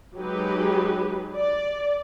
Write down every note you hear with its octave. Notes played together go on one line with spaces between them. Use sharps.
F#3 G#3 D#4 G4 G#4 B4
D5